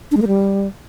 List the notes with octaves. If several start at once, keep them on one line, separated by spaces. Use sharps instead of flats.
D4
G#3
A#3
G3